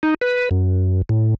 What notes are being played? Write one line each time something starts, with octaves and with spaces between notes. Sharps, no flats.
D#4
B4
F#2
A2